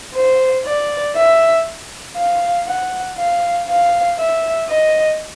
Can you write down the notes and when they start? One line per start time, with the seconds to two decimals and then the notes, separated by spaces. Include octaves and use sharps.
0.15 C5
0.66 D5
1.16 E5
2.17 F5
2.67 F#5
3.18 F5
3.69 F5
4.19 E5
4.69 D#5